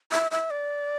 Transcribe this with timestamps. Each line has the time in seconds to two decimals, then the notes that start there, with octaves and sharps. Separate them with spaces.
0.12 E5
0.31 E5
0.51 D5